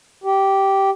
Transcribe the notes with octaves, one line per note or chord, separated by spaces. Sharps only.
G4